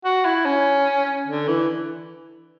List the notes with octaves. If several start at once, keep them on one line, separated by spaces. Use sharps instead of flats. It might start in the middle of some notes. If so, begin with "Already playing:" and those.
F#4
E4
C#4
D3
E3